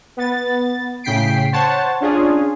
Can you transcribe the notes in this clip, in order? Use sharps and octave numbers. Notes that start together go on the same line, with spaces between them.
B3 A6
A2 C#3 G5 B6 C7 D7
C5 C#5 F#5 A5
C#4 D4 F4 G#4